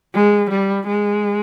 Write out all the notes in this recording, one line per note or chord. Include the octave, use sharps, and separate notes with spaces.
G#3
G3
G#3